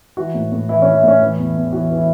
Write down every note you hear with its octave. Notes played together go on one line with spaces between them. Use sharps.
E3 F#4
A2
A2
E3 E4
E3 C#4
E4
A2 C#4
E3 E4
E2
E2
E3 F#4
E3
E4